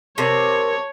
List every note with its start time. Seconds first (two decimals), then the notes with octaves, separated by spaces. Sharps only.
0.18 C3 A#4 C#5 A5